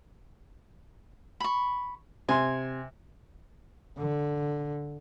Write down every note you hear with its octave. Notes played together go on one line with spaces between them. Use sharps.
B5 C#6
C3 G#5 C6
D3